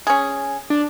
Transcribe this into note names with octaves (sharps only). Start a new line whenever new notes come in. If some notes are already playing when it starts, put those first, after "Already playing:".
C#4 G#4
D4